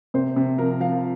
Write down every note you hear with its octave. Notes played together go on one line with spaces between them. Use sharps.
C3 C5
C3
F3 A#4
F3 F5